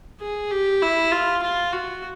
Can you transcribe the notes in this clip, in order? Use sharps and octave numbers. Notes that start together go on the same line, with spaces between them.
G#4
G4
E4
F4
F4
F#4